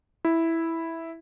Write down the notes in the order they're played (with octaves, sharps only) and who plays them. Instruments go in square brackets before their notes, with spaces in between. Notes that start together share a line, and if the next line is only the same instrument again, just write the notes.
[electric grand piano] E4